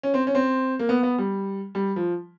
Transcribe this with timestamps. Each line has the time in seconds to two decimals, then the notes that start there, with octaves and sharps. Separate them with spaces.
0.03 C#4
0.14 C4
0.27 C#4
0.35 C4
0.79 A#3
0.89 B3
1.03 B3
1.18 G3
1.75 G3
1.96 F3